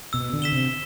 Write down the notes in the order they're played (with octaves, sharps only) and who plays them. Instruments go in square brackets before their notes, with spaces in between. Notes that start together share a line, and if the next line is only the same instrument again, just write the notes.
[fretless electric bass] B2 [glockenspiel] E6
[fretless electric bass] D3
[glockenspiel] B6 E7 G7
[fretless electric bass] C3